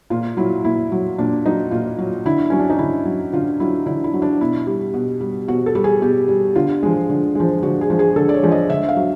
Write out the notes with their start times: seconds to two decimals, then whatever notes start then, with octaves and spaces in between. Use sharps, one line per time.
0.10 A#2 F4
0.37 F#3 E4
0.65 A#2 E4
0.92 F#3
1.18 A#2 D4
1.45 F#3 D#4
1.71 A#2 F4
1.98 F#3
2.25 D3 E4
2.50 F#3 C#4
2.59 D4
2.70 D#4
2.79 D3 E4
3.06 F#3
3.33 D3 F4
3.60 F#3 E4
3.86 D3 E4
4.04 E4
4.13 F#3
4.22 D4
4.40 B2 E4
4.67 G3
4.94 B2
5.21 G3
5.48 B2 F#4
5.66 A4
5.75 G3
5.84 G#4
6.02 B2 G4
6.28 G3
6.56 D3 F4
6.83 F3 G#3
7.10 D3
7.35 F3 G#3
7.63 D3 F#4
7.81 G#4
7.90 F3 G#3
7.99 G#4
8.16 D3 A4
8.29 D5
8.34 C#5
8.43 F3 G#3
8.52 D#5
8.70 D3 E5
8.89 F5
8.96 F#3